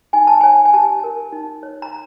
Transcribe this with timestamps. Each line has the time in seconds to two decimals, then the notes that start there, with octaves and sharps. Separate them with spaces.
0.13 D#4 G#5
0.27 A5
0.41 C#5 G#5
0.65 G#5
0.73 G4 A5
1.04 A#4
1.32 D#4
1.63 C#5
1.82 A#5